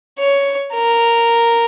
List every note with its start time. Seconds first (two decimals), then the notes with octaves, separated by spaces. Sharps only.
0.19 C#5
0.74 A#4